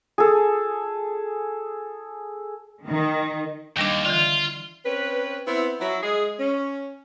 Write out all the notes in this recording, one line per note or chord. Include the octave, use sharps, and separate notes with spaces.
G#4 A4
D#3
D#2 D#3 G3 D4
D3 E3 F4
C4 C#4 B4
B3 C4 E4
F#3 E4
G#3 G#4
C#4